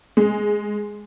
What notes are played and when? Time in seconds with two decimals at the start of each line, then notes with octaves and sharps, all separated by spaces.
0.17 G#3